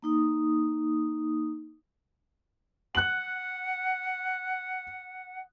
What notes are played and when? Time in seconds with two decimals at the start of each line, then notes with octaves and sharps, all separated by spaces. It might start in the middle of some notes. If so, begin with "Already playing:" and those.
0.02 A#3 D#4 D#6
2.95 F#5 F#6 F#7